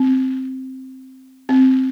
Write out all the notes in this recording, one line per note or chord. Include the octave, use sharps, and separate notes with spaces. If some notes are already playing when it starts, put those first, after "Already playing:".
Already playing: C4
C4